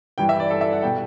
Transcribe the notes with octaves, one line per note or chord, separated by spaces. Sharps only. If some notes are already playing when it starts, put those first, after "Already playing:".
G2 E3 G3 G5
E5
D5
A4
E5
F#5
B2 G3 G5